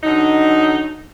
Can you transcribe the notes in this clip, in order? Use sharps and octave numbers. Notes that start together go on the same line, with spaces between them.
D3 F#3 D#4